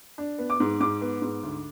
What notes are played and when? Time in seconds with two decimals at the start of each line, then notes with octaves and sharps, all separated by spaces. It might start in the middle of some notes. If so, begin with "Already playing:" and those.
0.18 D4
0.38 B3
0.50 D6
0.60 G#2
0.80 G#2 D6
1.01 B3
1.22 G#2
1.43 D2